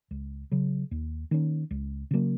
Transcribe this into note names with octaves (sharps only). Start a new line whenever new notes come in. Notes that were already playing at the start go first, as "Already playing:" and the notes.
C#2
C#3 F#3
D#2
D#3 A#3 C#4
C#2
C#3 F#3 A#3